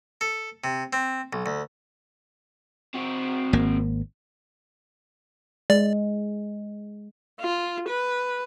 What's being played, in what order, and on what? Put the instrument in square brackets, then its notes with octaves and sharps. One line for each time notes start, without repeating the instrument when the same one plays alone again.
[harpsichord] A4
C3
C4
B1
D2
[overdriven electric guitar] C4 F#4
[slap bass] G#1 A#3
[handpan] G#3 [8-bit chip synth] D5
[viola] F4
B4